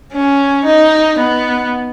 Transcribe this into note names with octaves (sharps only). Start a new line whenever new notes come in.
C#4
D#4
B3